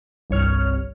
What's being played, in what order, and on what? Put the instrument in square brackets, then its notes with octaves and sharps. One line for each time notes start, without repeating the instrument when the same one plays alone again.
[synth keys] G1 C2 C#5 F6